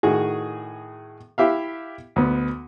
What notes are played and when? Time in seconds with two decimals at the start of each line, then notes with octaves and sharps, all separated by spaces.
0.03 A2 D#3 F#4 G#4
1.38 E4 G4 E5 F5
2.16 D2 B3